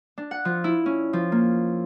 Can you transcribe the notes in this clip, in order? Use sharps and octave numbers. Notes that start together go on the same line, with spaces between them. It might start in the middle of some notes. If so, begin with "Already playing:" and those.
D4
F#5
F3
E4
C#4
F3
A#3